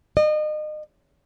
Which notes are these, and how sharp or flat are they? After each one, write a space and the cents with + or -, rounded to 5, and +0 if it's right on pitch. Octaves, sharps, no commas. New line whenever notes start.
D#5 -35